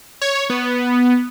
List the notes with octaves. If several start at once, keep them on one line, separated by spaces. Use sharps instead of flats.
C#5
B3